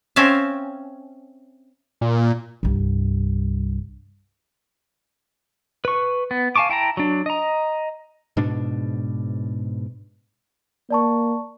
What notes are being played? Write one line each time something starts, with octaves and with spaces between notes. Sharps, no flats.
C4 C#4 E5 F5
A#2
C2 G2
B4 C#6
B3
F5 G#5 A5 C#6 D6
E4 G5 A5 A#5
F#3 D4
D#5 A#5
G#2 B2 D4
A#3 D5 A5 C#6